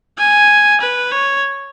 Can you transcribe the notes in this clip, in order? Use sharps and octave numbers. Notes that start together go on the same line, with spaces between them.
G#5
B4
C#5